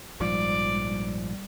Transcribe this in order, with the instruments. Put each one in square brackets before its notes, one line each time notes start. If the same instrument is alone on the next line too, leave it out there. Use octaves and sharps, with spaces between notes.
[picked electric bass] A#1 G#2 F3 [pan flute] G3 [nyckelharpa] D5